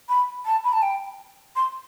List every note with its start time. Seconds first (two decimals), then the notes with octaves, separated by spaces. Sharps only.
0.09 B5
0.45 A5
0.64 B5
0.73 A5
0.82 G5
1.56 C6